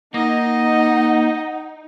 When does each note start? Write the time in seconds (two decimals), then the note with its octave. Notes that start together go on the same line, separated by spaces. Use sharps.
0.14 A#3 D#4 D#5 F#5